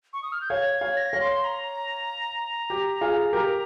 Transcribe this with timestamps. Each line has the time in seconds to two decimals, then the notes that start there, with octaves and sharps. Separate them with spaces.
0.13 C#6
0.22 D#6
0.32 F6
0.41 G6
0.50 C#5 F5 G#6
0.74 G#6
0.81 C#5 F5
0.97 A#6
1.13 C#5 F5
1.21 C6
1.45 A#5
2.70 G4
3.01 F4 G#4
3.33 G4 A#4 A#5